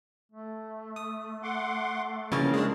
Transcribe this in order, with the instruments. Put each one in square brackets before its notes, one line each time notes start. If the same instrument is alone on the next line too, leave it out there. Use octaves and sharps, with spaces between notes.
[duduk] A3
[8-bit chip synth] D#6
[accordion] F#5 C6 D6
[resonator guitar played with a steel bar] C#3 A#3 [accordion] E3 C4 [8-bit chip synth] F3 A6 [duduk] C#4
[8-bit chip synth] G#3 D4